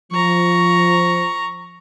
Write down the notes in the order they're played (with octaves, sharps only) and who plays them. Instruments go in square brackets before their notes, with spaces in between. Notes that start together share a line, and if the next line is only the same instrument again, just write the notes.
[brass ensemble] F3 [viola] A#5 C#6